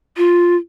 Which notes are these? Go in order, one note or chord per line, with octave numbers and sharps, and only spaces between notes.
F4